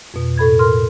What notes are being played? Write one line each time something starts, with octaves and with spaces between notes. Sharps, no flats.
F2 B2
A2 A4 B5 G#6
A#4 C6 F6